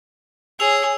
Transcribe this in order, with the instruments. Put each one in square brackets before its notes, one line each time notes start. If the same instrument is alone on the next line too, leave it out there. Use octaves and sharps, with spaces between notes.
[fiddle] G#4 C#5 [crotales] E6 F7